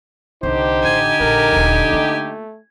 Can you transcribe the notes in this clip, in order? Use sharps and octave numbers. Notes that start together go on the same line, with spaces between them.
C2 D3 D#4 G4 C5
A1 F4 G#5
A#1 F#3 A#4
D#1 G#1
A3 A#3 F4